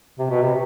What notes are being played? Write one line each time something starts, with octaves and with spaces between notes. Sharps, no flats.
C3
B2
C3